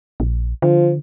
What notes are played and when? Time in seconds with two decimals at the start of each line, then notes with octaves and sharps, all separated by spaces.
0.20 A#1
0.62 D3 F3